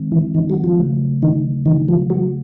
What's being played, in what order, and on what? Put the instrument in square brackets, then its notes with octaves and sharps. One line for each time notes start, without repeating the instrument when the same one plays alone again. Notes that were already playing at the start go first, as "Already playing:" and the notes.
Already playing: [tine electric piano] D#3 G#3 C4
[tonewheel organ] E3
D#3
F#3
F3
[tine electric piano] C#3 F#3 A3
[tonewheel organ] D#3
D#3
F3
F#3